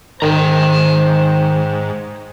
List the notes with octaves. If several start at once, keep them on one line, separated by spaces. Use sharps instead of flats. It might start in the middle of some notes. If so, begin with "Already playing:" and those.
G#2 D#3 C5 G5 A#5